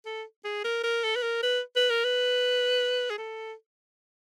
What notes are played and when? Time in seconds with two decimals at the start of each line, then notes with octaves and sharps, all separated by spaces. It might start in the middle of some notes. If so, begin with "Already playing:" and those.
0.05 A4
0.45 G#4
0.65 A#4
0.84 A#4
1.04 A4
1.16 B4
1.23 A#4
1.43 B4
1.76 B4
1.90 A#4
2.04 B4
3.10 G#4
3.18 A4